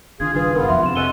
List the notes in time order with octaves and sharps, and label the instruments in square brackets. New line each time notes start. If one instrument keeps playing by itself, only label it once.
[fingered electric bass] F#1 D#3 D4 [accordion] F4 G#4 [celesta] G#6
[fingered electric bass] F#1 G2 D#3 [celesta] D4 B4 [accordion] F4 G#4
[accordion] G#2 B3 F4 [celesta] A#4
[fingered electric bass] F1 F2 F#3 [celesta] E5 C6
[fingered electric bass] C3 [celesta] C6 E7
[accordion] C#4 A4 F#5 [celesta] D#5 D#7 G7